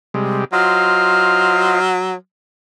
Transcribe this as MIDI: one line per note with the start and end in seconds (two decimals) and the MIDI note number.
0.14 0.45 48
0.14 0.45 55
0.14 0.45 56
0.53 2.14 54
0.53 1.80 65
0.53 1.80 72
0.53 1.80 75
0.53 1.84 89